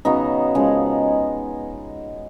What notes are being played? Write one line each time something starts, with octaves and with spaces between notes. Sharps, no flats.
C#3 F#3 B3 D#4
C#3 F3 G#3